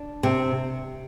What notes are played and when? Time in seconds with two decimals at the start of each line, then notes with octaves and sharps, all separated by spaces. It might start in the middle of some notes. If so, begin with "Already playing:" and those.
Already playing: D4
0.23 C3